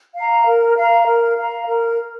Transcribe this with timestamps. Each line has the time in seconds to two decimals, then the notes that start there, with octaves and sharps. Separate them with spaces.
0.16 F5 A#5
0.46 A#4
0.77 F5 A#5
1.07 A#4
1.38 F5 A#5
1.68 A#4